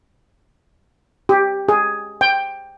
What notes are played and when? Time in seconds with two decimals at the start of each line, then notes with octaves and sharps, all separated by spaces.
1.29 G4
1.69 G#4
2.21 G5